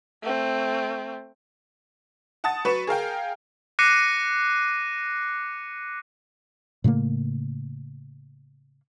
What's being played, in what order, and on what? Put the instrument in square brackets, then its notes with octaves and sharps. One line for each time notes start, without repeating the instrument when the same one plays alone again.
[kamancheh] A3 C4
[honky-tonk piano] F#5 A5 D#6 A6
F#3 B4 C#6 C#7 E7
G#4 A#4 F5 G5
[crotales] D6 F#6 A#6 C7 C#7 D#7
[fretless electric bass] A2 C#3 A3 A#3